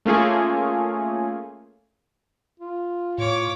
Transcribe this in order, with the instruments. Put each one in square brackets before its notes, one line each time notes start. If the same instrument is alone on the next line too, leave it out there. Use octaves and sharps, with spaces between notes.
[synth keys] A3 A#3 C#4 F4 G#4
[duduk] F4
[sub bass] A2 [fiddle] C#5 D6